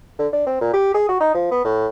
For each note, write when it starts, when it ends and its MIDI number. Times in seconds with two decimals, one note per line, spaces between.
0.19 0.27 50
0.33 0.43 62
0.47 0.58 60
0.61 0.72 46
0.73 0.91 67
0.94 1.07 68
1.09 1.19 66
1.20 1.32 63
1.34 1.49 53
1.51 1.64 59
1.65 1.87 45